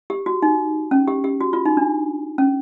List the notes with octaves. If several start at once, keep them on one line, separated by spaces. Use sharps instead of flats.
G4
F#4
D#4
C#4
G4
G4
F#4
F4
D#4
D4
C#4